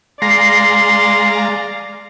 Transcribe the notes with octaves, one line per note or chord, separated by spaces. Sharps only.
G#3 D5 F5 A#5 C6 A#6 C7